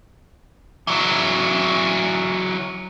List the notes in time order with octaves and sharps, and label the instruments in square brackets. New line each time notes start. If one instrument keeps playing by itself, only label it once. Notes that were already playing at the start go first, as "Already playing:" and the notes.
[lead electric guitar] E3 F#3